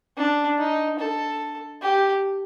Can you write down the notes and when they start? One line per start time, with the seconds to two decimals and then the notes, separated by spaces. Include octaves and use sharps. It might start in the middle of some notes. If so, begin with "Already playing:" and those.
0.17 D4
0.59 D#4
0.99 A4
1.82 G4